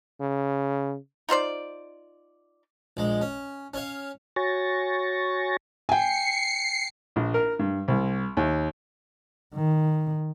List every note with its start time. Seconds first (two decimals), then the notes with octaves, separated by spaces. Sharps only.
0.20 C#3
1.29 D#4 F4 C5 D5
2.97 A#1 G#3
3.21 C#4
3.74 C#4 C#5 F5
4.36 F#4 C#5 G#5 C#6 A6 A#6
5.89 G5 G#5 C7 C#7
7.16 A#1
7.34 A#4
7.59 G2
7.88 C2
8.37 D#2
9.54 D#3